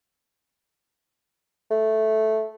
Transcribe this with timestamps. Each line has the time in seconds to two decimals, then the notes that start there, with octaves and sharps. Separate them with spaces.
1.71 A3